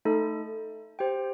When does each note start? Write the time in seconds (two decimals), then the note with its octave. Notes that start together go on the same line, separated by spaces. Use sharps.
0.05 A3 D#4 A4
0.99 G4 C5 G5